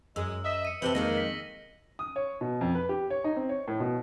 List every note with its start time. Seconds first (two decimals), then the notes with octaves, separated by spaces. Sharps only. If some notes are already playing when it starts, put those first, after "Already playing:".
0.16 F#2 G#3 E6
0.45 D#5 E5
0.65 C#7 D#7
0.82 C3 C4 B4 G5 A5 F#7 G7
0.95 F2 D#3 G#3 A#3 D#4 A#6
1.17 B6
1.99 D#6
2.16 C#5
2.41 B2
2.61 F2
2.75 B4
2.89 G4
3.10 C#5
3.24 D#4
3.36 C4
3.49 C#5
3.68 A2
3.80 B2